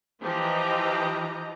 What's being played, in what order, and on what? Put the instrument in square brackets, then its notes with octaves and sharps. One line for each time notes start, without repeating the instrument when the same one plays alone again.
[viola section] E3 F3 G4 D#5 A#5